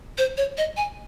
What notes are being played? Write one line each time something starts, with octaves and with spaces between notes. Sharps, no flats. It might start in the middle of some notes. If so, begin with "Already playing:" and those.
C5
C#5
D#5
G#5